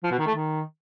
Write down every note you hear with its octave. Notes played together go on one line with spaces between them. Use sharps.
F3
B2
D#3
A3
D#3